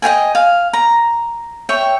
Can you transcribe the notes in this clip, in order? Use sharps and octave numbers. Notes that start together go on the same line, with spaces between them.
D#5 F5 G5 G#5
F5
A#5
C#5 E5 G5